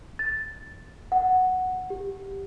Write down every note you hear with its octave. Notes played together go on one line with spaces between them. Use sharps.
A6
F#5
G4